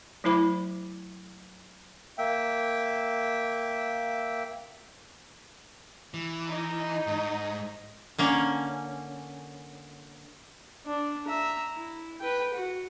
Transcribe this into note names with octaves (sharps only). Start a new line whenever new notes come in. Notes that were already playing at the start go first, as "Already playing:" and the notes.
F#3 A3 E4 C5 B5 D6
A#3 E5 G5
E3
D#4 D#5
G#2
D3 A#3 C#4
D4
E5 A#5
E4
B4 G5
F#4